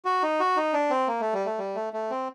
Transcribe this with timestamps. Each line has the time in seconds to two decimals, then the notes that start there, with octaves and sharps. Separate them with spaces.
0.05 F#4
0.23 D#4
0.40 F#4
0.57 D#4
0.73 D4
0.90 C4
1.08 A#3
1.21 A3
1.34 G3
1.46 A3
1.58 G3
1.76 A3
1.93 A3
2.10 C4